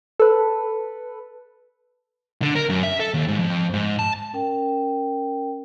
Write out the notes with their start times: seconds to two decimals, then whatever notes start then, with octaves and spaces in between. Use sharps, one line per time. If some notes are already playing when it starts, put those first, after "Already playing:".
0.20 A4 B4
2.42 D3
2.55 A#4
2.70 F#2
2.83 E5
3.00 A4
3.14 D#2
3.28 G#2
3.39 F2
3.74 G#2
3.99 A5
4.33 C#4 A#4 G5